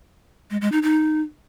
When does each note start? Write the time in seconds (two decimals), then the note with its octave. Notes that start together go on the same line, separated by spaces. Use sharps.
0.50 G#3
0.61 G#3
0.72 D#4
0.83 D#4